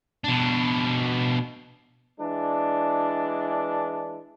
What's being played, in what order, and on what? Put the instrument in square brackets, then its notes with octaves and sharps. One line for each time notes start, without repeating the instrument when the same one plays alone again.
[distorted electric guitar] B2 D4
[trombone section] E3 G#3 D4